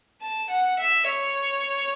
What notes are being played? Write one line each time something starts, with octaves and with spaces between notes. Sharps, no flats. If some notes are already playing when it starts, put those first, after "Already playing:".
A5
F#5
E5
C#5